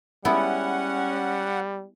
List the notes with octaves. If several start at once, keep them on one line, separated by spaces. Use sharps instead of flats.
G3 G#3 B3 C#4 E4 F#5